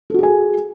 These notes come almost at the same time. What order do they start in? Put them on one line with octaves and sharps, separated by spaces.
A4 F#4 G#4 G#5